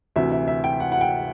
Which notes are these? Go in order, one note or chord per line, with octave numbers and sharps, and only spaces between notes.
D2 C3 E3 E5
E5
E5
G5
F#5
F#5
G5